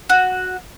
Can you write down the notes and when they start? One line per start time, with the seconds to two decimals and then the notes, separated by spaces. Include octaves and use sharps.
0.09 F#4